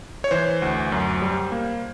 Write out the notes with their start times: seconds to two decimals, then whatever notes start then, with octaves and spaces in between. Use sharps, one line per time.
0.24 C#5
0.31 E3 C5
0.62 D2
0.92 F#2
1.22 G3
1.52 A#3